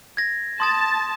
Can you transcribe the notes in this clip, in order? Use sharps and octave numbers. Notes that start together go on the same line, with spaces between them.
G#6 A#6
A5 C6 D#6 A6